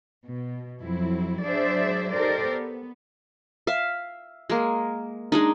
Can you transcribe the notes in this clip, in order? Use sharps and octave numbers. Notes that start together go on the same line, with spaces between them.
B2
F2 F#3 C4 E4
F#3 D4 G#4 C5 D5 E5
D#4 G4 A4 A#4 C5 D5
B3
E5 F5
G#3 A#3
G#3 D4 D#4